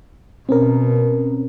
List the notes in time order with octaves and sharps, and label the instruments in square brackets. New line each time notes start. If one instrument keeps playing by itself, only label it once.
[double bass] B2 [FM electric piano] C4 C#4 A#4